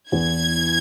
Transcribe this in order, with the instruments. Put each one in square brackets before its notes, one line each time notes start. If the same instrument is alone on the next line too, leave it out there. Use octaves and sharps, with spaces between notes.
[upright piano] E2 [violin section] G#6